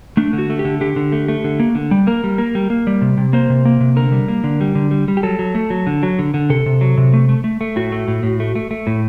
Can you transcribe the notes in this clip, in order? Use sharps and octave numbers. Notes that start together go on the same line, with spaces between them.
A3 D4
D3
F#4
A3
G4
D3
D3 G4
D3
A3
A3
D3
A#3
D3
G3
A#3 A#4
G3
A#3
G3
A#3
G3
C3
C3
A#3 C5
C3
A#3
C3
D3 A#4
G3
A#3
D3
G3
D3
G3
G3
G4
F#3 A4
F#3
A3
F#3
D3
F#3
D3
D3
C3 A4
C3
F#3
C3
A3
A3
A3
A3
A2 F#4
A3
A2
A2
A3
A3
A3
A2